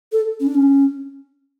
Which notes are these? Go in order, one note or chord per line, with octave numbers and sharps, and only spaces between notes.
A4
C#4
D4
C#4